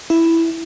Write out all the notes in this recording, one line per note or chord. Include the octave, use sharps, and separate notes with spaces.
E4